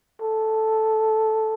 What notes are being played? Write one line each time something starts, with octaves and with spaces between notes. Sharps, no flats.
A4